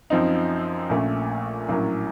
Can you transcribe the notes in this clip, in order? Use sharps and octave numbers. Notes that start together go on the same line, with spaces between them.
F#2 F3 C4 D#4
A#1 A#2 A3 C#4
A#1 A2 F#3 A#3 C#4